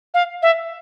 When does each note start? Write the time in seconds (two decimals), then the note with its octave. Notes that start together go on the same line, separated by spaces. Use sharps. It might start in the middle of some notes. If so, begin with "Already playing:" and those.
0.14 F5
0.42 E5